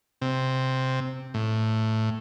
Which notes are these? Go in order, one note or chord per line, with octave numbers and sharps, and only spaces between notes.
C3
A2